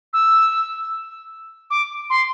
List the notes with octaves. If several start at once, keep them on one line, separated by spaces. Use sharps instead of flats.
E6
D6
C6